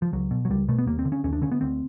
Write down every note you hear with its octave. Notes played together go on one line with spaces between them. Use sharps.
F3
C#2 F#3
B2
F#3
C#2 G3
B2 A3
B3
D#2 A#3
C4
D3
C#4
D#2 C#4
D4
D3 C#4
B3
D2 C4